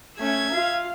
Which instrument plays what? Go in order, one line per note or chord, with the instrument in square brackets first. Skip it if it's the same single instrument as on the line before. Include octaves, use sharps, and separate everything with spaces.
[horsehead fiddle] A3 C#4 [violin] E5 G#6
[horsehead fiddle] F4 F5